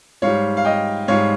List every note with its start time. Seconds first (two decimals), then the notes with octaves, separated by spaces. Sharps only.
0.22 G#2 G3 C#5 F5
0.57 F5
0.65 D#5 G5
1.08 G#2 G3 C#5 F5